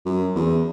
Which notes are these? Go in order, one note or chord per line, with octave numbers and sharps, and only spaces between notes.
F#2
E2